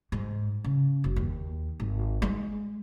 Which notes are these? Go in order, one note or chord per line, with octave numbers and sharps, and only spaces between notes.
G#2
C#3
F#1
D#2
G#1
G#3